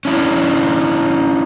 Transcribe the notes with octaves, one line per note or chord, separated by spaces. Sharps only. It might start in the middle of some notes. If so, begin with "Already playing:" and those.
C#4 D4 E4